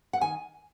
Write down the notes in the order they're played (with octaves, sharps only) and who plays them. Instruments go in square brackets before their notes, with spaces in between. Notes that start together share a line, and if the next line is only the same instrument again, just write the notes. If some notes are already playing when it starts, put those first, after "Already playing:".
[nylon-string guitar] F#5
D#3 G#5